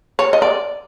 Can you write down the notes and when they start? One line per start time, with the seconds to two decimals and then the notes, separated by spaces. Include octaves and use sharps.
0.19 C#5
0.33 D#5
0.42 D5